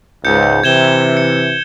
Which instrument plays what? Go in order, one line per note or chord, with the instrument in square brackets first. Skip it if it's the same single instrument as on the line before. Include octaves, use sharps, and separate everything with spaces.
[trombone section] C#2 G#2 [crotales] G6 C#7
[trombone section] C3 E3 [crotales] G#6 E7 G7
[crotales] C#7